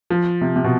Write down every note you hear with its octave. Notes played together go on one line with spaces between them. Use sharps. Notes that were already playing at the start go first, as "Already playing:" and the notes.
F3
C3
C3
B2